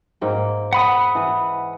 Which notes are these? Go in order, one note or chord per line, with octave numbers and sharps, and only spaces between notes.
G#2 A#3 G5
F#5 B5 D#6
E3 B4